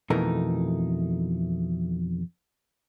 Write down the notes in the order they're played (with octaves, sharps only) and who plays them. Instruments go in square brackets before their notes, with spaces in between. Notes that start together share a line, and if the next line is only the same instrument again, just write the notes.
[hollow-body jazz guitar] F2 B2 E3 A3 D#4 A#4